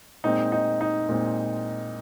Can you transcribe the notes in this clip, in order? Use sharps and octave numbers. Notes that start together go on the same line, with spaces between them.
A#2 G#3 C4 D#4
D#4
D#4
A#2 G#3 C4